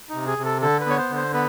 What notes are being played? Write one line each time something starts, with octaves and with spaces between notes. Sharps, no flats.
C3 D#4
G#4
C3
A4
D3 A4
B4
B3 C#5
C5
D3
C5
B3 B4